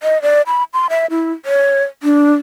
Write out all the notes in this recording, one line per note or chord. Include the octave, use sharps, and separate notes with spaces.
D#5
D5
B5
C6
E5
E4
C#5
D4